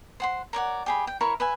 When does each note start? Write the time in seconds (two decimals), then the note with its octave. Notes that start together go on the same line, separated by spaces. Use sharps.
0.20 C5 F#5 C6
0.53 A#4 C#5 D5 F#5
0.86 G4 G#4 B5
1.07 G5
1.21 E4 A#4 C#5 C#6
1.40 B4 E5 G#5